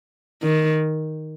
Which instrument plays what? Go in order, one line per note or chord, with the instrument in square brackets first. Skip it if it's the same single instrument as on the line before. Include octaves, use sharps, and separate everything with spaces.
[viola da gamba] D#3